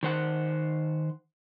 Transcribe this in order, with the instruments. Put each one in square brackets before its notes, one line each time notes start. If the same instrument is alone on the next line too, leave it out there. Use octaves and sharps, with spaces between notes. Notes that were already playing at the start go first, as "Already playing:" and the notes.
[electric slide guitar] D#3 C5 F#5